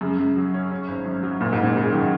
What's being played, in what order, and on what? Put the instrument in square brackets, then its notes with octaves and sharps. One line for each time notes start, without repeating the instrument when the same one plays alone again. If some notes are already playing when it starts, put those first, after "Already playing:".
[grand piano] F#2 [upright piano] C#3
[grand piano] F#2
F#3
C#4
C#4
G#1
F#2
F#3
[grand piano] F#1 [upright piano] A#2
[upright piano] G#2
[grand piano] F#1
[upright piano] A#2
[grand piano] F#2 [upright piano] C#3
[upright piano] D#3 [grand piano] F#3